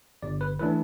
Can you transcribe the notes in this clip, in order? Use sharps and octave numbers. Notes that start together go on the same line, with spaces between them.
G1 D5
B4
E3 A3 D4 B4